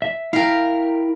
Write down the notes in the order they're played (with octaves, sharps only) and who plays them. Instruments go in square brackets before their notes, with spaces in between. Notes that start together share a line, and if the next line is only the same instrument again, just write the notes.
[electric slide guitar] E5
[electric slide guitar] E4 E5 G5 [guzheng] A#4 F5